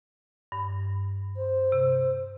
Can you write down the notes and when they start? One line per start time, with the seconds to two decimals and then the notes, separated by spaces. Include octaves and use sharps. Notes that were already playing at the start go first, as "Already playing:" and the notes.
0.52 G2
1.36 C5
1.72 C3